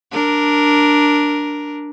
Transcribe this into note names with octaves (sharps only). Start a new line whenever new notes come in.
D4 A#4